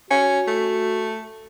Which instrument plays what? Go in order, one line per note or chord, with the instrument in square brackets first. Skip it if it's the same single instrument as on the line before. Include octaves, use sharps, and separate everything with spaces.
[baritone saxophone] C#4 [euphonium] F#4
[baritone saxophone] A3